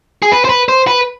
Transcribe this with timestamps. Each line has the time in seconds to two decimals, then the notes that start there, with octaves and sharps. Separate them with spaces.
0.22 G#4
0.32 B4
0.45 C5
0.49 B4
0.69 C5
0.87 B4